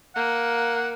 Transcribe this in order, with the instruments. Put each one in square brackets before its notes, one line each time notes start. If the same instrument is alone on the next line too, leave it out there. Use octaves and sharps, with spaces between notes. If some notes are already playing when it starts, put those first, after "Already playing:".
[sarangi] A#3 [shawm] F#5